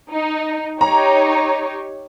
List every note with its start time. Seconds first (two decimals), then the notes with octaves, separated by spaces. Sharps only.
0.12 D#4
0.81 D#4 G4 C#5 A#5